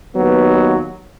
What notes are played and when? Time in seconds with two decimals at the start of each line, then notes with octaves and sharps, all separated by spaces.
0.15 D#2 F#3 B3